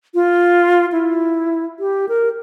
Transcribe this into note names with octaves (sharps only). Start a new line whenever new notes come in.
F4
E4
G4
A#4